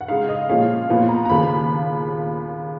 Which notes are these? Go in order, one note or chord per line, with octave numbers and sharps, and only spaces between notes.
F#5
C#3 G#3 D#4 F5
D#5
A#2 F3 G#3 C#4 F5
A#2 F3 B3
A#5
A#5
D#2 C#3 F3 B5